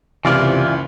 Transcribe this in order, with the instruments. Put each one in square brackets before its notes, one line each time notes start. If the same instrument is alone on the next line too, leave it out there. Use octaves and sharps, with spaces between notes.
[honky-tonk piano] F#1 C#2 F6 [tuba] C3 [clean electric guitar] E3 F4 D5